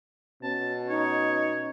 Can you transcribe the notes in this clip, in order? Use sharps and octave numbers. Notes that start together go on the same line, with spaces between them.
B2 C#4 A5
D#4 C#5